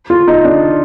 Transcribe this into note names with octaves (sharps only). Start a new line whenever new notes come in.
F4
D#4
D4